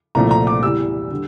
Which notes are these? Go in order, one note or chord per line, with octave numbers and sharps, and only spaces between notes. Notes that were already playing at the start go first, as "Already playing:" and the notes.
C2 A#2 F3 A3 A#5
A#5
D6
E2 E3 G3 E6
D3 G3